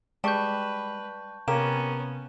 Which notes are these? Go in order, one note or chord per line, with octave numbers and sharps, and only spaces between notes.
G3 G#3 B4 A5 C#6 G6
C3 A#3 B3 C#4 G4 A#4 E7